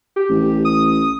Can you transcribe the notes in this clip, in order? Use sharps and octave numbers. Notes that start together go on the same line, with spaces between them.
G4
A1
D#6